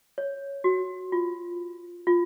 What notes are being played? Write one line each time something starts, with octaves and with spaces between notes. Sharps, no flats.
C#5
F#4
F4
F4